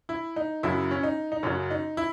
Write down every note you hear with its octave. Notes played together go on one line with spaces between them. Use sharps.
E4
D#4
F#2 C#3 F#3 E4
C#4
D#4
D#4
F#2 C#3 F#3 C#4
D#4
E4